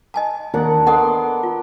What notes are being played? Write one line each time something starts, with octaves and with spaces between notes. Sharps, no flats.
D#5 G#5 A5
D#2 D4 A#4 F#5
B3 A4 D#5 F#5 C6 D6
F4